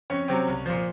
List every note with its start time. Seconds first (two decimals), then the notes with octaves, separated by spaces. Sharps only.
0.10 F2 C#4 C#5
0.28 C3 F#3 C4
0.48 C2
0.66 A#2 F3